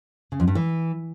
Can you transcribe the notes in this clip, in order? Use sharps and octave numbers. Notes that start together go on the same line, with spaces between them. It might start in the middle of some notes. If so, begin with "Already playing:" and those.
C#3
F2
G2
E3